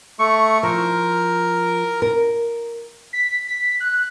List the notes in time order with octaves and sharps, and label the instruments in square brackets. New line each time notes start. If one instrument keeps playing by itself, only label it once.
[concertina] A3 C#6
[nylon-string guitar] F3 [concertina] A#4
[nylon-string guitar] A#4
[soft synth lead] B6
B6
F#6